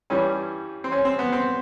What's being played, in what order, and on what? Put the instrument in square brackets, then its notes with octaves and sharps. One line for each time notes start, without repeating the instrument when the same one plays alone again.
[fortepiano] G2 E3 G3 C#4
C4
C#4
C4
B3
C4